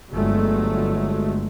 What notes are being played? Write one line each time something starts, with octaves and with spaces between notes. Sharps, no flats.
G1 F#3 G#3 A3